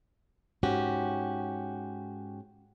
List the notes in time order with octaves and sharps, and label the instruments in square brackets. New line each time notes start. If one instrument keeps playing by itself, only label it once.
[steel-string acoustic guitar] G#2 C#4 F#4 G4